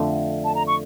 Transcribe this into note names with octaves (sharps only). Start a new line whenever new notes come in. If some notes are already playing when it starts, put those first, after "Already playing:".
Already playing: F2 D3 A3
A5
A#5
C#6